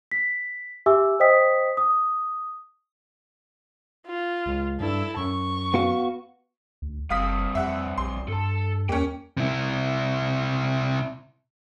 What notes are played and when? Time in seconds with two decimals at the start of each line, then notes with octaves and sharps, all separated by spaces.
0.11 B6
0.86 G4 E5 G#5 D6 E6
1.20 C5 D#5 G5 D#6 B6
1.77 D#6
4.07 F4
4.46 C#2
4.80 G2 E4 A4
5.17 F#2 C#6
5.74 B3 F#4 F5
6.82 D2
7.10 F#1 G2 C4 F5 D#6 B6
7.55 F2 E5 F#5
7.98 A#1 C6
8.28 G2 A4 A5
8.89 E2 A#3 C#4 G5
9.37 C3 E4